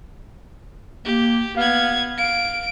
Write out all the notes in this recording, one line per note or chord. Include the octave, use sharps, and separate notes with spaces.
A#3 G4
B3 F5 G#6
F5 D7